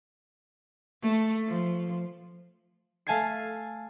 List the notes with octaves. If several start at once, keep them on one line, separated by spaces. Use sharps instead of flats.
A3
F3
A3 F5 G#5 A5 G#6 C7